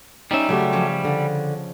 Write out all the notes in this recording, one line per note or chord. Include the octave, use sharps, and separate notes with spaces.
G3 C#4 D#4 E5
C#3 F#3 A3 G4
F3 C#4
D3